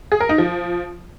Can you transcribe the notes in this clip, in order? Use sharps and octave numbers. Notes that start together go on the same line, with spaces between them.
G#4
A#4
D#4
F3